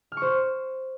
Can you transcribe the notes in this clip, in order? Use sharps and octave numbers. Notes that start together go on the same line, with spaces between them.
F6
C#6
C5